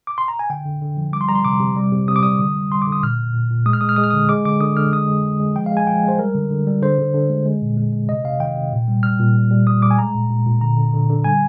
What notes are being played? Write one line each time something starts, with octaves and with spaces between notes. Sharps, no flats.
D6
C6
A#5
G#5
D3 G5
D3
D3
F3
G3 D6
C6
G3 A#5
C6
C3 D6
C3
G3
C3
C3 D#6
D6
G3 D#6
D3
G3
G3 C6
D3 D6
D#6
A#2 F6
A#2
A#2
A#2
G#3 D#6
F6
G#3 D#6
F6
G#3 D#6
F6
D3 D#6
G#3 D6
D3 D6
D3 D#6
D3 F6
G#3 D#6
G#3
G#3
G#3
F3 G5
F5
G#3
G#5
F3 G5
G#3 C5
G3 A#4
D3
D3
G3
D3 C5
D3
D3
G#3
G#3
A#2
G#3
G#3
C3 D#5
C3 F5
D#3 G5
C3
A#2
G3
G3 F6
A#2
G3
G3
G3 D#6
G3 D6
G#5
G#3 A#5
A#2
A#2
A#2
D3 A#5
D3
D3
D3
G3 G#5